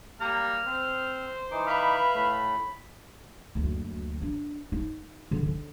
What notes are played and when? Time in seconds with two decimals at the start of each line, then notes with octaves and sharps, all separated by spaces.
0.21 G3 A#3 A#5 F6
0.66 C4 C5
1.51 E3 D#4 D6
1.67 B4 E5 F5 B5
2.14 A2 A3
3.55 F#1 D2
4.22 D4
4.72 D#4
5.31 D3
5.46 D3